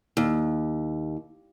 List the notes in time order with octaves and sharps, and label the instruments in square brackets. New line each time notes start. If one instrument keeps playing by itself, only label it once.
[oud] D#2